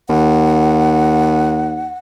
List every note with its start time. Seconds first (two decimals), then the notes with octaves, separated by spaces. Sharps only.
0.09 D#2 F#5